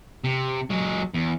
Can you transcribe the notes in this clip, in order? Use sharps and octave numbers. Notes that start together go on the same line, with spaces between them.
C3
F#3 G#3
E2